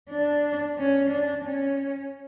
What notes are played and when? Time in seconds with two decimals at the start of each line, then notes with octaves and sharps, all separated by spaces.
0.10 D4
0.78 C#4
1.10 D4
1.44 C#4